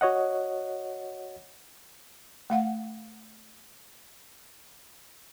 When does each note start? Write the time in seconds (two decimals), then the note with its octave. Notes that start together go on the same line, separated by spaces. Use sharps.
0.01 F#4 C#5 D#5 F#5
2.50 A3 F5 F#5